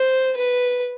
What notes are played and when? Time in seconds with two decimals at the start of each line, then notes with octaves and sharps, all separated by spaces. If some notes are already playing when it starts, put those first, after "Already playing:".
Already playing: C5
0.37 B4